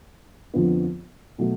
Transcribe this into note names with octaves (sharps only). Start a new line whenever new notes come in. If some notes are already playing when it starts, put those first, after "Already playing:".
F2 D3 F3 B3
B2 F#3 A3